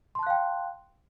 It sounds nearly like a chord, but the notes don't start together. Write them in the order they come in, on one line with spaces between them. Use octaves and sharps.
C6 A5 F#6 F5 G5